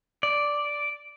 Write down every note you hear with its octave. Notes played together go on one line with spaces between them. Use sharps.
D5